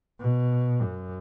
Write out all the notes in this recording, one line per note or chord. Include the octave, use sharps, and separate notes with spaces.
B2
F#2